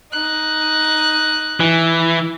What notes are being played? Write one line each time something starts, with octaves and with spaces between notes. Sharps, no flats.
D#4 F#6
E3